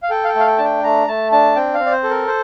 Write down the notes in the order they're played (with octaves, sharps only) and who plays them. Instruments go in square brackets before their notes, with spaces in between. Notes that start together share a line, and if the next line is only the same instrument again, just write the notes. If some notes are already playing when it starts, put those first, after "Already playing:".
[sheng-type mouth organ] F5
A4 G5
F5
G5
A3 F5
G5
D4 A5
G5
A3 A#5
A3 A5
D4 A5
C4 G5
F5
C4
D5
C5
A4
A#4
C5